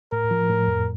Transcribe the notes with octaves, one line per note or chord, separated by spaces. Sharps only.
A2 A#4
F3
A2
F2